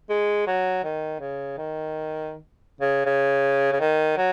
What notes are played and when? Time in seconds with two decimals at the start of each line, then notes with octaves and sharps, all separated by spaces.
0.10 G#3
0.47 F#3
0.84 D#3
1.20 C#3
1.58 D#3
2.81 C#3
3.06 C#3
3.72 C#3
3.80 D#3
4.17 F#3